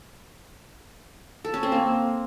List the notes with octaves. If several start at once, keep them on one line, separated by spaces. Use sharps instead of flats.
A4
C#4
C4
A#3